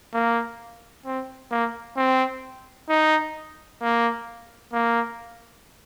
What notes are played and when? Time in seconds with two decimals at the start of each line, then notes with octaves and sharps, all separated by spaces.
0.14 A#3
1.05 C4
1.51 A#3
1.97 C4
2.89 D#4
3.82 A#3
4.73 A#3